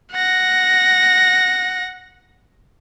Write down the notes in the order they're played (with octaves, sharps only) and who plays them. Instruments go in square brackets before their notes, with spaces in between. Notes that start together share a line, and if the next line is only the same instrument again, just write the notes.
[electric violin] F#5 A#6